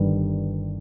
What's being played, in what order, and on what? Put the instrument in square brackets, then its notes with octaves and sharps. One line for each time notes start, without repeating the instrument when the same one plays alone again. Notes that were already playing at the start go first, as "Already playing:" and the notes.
Already playing: [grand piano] G1 G2 D#3 G3